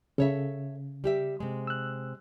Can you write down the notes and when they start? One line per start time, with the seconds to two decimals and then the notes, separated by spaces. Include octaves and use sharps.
0.18 C#3 A4 C#5 E5
1.04 G3 G4 E5
1.40 C3 G#3
1.67 E6 F#6